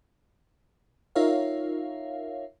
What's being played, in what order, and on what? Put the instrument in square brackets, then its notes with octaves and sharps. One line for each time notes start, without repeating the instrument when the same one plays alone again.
[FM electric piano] D#4 F4 A#4 C#5 E5 F5